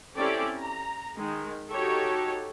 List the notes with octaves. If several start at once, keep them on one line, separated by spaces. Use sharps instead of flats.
C4 C#4 E4 G4 A4 D5
A#5
D#3 G#3
D#4 F#4 G4 A4 C#5